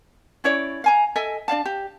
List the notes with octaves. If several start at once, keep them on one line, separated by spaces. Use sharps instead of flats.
C#4 E4 C#5 D5
F5 G#5 A#5
A4 D#5 E5 G#5
D4 D5 F5 A5
G4